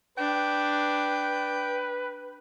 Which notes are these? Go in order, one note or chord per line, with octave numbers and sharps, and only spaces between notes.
D4 B4 G5